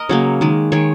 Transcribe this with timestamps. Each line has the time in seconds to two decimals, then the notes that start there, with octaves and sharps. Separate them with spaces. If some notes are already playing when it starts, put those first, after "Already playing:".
Already playing: A#4 D#5
0.09 C#3 F#3 A#3 C#5
0.41 D#3 G#3
0.72 D#3 G#3 C#5